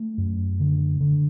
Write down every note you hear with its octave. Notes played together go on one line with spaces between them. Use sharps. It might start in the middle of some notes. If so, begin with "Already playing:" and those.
Already playing: A3
F#2
D3
D3